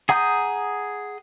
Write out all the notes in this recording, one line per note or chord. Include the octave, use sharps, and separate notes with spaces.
G#4 F#5 A#5 D#6 G6